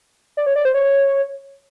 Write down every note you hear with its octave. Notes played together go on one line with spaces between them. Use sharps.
D5
C#5
D5
C5
C#5